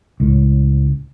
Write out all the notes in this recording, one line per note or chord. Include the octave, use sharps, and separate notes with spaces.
C#2 A2